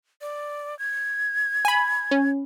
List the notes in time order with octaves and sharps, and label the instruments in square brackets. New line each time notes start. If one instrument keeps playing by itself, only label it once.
[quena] D5
G#6
[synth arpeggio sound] G#5 B5
C#4